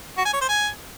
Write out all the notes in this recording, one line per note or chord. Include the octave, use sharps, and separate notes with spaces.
F#4
G#5
C#5
C5
G#5